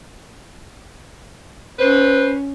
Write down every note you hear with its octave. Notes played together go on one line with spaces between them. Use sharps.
C#4 B4 C5